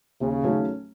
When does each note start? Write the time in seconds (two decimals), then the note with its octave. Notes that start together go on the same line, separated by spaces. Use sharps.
0.21 D#2 C#3
0.42 D#3 F#3 A3 C#4